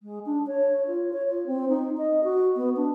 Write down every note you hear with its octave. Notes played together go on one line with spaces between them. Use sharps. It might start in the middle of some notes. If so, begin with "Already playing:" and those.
G#3
D4
C#5
F4
C#5
F4
C4
D#4
D#5
F#4
B3
D4